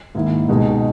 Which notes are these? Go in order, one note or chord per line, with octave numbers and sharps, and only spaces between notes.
G#2 D#3 A#3 E4
C#2 B2 G#3 D#4 F#4